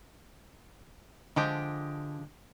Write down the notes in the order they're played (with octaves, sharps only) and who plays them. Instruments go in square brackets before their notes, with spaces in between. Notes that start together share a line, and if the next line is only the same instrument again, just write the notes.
[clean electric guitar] D3 [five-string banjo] F3 G#3 G4